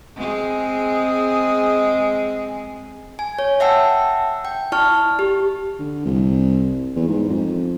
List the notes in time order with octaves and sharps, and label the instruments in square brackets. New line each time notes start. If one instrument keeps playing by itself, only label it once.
[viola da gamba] G#3 C4 G#4
[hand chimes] G#5
C#5
E5 F#5 G5 A5 E6
G5
E4 D5 A5 C#6 F6
G4
[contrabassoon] D3
C2
E2
G#2
F2